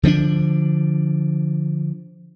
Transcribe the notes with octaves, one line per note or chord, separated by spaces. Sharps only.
D3 F3 G3 D4